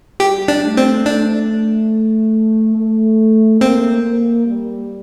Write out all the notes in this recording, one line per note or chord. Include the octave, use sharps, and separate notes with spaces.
G3 G4
D4
A3
C4
A3 D4
A3
A#3 C4
A#3
G3